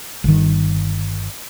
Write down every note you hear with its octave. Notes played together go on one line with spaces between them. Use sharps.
G1 D#3